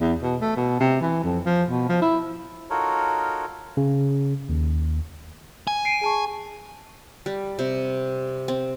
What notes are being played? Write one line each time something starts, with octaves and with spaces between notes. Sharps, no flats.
E2
B2
A3
B2
C3
E3
F2
F3
B2
F3
E4
D#4 F4 F#4 A4 A#4 C#5
C#3
D#2
G#5
C7 D7 D#7
G#4 A5 C#6
G3
C3
C4